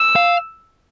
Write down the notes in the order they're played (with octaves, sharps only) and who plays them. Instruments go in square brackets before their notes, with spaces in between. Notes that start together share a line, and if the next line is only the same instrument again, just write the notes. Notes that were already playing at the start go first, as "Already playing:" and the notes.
Already playing: [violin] E6
[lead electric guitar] F5